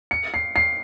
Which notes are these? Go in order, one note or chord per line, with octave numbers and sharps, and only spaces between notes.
C#7
C7
C7